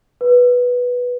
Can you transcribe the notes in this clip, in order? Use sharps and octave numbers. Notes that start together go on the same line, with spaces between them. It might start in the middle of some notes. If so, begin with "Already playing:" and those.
B4